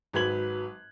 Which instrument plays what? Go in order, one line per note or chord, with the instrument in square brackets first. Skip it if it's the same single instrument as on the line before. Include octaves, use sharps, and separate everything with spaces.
[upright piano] G#1 F#3 B4 G#6 F#7